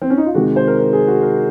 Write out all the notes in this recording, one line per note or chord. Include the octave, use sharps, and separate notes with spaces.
C4
C#4
D#4
F4
C3 D#3 G#3 F#4
C5
A#4
A#4
G#4
F#4
A#4